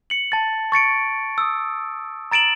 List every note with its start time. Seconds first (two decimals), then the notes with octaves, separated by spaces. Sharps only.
0.10 C#7 F#7
0.32 A5 A6
0.72 C#6 A6 C#7 D7
1.38 D#6 E6
2.31 A#5 A6 D7 E7 F#7